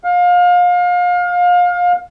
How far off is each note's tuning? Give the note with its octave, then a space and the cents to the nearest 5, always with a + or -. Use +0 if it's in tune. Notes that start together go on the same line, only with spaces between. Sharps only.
F5 +30